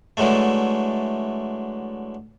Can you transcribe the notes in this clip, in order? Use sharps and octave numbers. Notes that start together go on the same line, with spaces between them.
D3 E3 F#3 G#3 A3